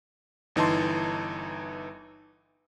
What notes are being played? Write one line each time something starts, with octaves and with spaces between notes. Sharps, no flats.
G1 E3 D#4 A5 C6